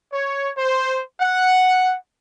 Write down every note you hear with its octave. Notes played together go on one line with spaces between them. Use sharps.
C#5
C5
F#5